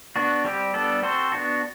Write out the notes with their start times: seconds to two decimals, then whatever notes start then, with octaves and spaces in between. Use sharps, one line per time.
0.16 B3 D4 F#4
0.45 G3 C4 G4
0.74 G3 B3 D4 A4
1.03 C4 F#4 A4 C5
1.32 B3 D4 F#4